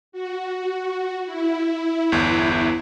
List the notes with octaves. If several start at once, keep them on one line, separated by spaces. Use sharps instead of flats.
F#4
E4
G1 E2